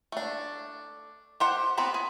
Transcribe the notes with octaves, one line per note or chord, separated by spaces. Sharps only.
A3 D4
G4 C5 F#5
B3 C4 B4 A#5
G#4